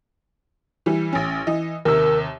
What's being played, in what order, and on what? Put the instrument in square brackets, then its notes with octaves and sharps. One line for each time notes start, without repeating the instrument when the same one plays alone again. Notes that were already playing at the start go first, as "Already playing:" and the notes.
[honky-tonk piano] E3 G3
A1 C#4
E3 D#5
[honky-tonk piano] D#2 C3 [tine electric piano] A#4 E6